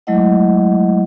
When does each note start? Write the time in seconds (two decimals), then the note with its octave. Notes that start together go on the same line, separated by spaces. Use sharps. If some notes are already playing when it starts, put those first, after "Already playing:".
0.07 F#3 G#3 A3 E4 D#5 F#5